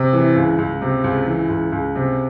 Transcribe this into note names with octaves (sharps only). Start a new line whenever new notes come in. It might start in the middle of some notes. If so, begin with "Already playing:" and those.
Already playing: C3
E3
C#2
C#2
C3
C#2
E3
C#2
C#2
C3